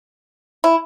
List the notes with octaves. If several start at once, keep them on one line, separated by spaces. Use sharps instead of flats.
E4